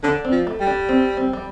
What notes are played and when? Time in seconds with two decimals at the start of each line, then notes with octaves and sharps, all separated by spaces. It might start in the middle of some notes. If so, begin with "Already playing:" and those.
0.04 D3 D4
0.25 C4
0.32 F3
0.47 A3
0.60 G3
0.67 D4
0.89 C4
1.17 C4
1.33 G3